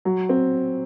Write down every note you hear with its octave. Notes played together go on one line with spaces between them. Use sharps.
F#3
C4